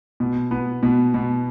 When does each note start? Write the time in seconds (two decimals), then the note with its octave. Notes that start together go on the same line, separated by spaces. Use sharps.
0.20 B2
0.51 B3
0.83 B2
1.14 B2